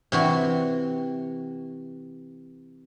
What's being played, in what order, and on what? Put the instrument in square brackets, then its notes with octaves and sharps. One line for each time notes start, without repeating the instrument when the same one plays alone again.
[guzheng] C3 E3 F#4